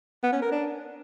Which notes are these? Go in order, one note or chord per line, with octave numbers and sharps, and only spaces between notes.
B3
C#4
A#4
D4